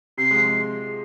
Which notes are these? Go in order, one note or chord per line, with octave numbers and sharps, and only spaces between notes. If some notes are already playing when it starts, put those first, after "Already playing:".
C3 C7
G#3
F3